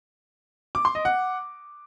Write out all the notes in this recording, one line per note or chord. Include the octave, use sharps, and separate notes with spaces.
D6
C6
D#5
F#5